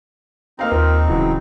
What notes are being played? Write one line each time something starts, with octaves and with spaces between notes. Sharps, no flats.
A#3 C4 D#4 F5 A#5
D#2 F4 A#4
D#1 C#3 E3 F#3